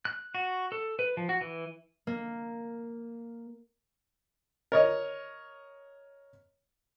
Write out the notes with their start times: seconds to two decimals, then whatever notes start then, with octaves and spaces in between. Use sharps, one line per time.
0.05 F#6
0.35 F#4
0.72 A4
0.99 B4
1.17 F3
1.29 F#4
1.41 E3
2.07 A#3
4.72 A#4 C#5 D#5